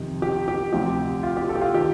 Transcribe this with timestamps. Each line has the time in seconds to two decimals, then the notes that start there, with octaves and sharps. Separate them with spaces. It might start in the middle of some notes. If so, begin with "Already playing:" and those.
Already playing: F2 C3 D#3
0.22 G4
0.48 G4
0.73 D2 C3 F3 G4
1.23 F4
1.37 G4
1.49 A4
1.55 G4
1.61 F4
1.74 D#3 G4